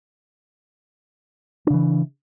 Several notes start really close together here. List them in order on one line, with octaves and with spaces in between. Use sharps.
D4 C#3 E3